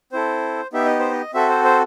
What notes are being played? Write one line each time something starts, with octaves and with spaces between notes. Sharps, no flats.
C4 E4 A4 C5
B3 D#4 G4 E5
D#5
C5
D#5
C4 F#4 A4 E5
C5
C5